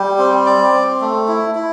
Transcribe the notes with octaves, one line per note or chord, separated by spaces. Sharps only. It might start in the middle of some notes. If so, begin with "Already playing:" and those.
Already playing: G3 G4
C4
D5
C4
A3
E4
E4